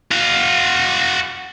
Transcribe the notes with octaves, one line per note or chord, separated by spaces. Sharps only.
F#4 F5